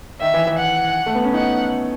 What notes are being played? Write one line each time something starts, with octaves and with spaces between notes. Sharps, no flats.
D#3 E5
E3
E3
F#5
A3
B3
C#4
D#4 F#5